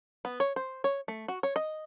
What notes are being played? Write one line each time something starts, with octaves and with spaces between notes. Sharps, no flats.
B3
C#5
C5
C#5
A3
F#4
C#5
D#5